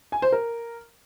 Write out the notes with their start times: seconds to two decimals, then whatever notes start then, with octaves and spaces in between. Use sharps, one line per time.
0.12 G#5
0.22 C5
0.32 A#4